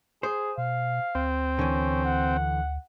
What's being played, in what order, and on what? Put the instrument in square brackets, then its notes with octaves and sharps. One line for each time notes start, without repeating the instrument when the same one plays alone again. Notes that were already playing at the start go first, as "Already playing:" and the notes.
[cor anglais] G#4 [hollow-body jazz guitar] C5
[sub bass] B2 [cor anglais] F5
[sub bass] D2 [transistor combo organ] C4
[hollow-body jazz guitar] D3 E3 [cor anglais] C#4
[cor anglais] F#5